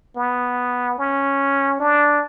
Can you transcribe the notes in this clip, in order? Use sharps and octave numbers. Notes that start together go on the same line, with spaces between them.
B3
C#4
D4